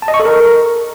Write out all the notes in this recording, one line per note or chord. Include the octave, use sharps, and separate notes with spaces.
A5
D#5
C#6
A4
A#4